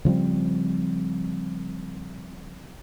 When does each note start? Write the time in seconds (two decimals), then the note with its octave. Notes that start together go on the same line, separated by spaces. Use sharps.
0.05 C#3 F3 G3 C4